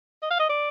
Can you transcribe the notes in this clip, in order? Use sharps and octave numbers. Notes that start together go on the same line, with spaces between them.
D#5
F5
D#5
D5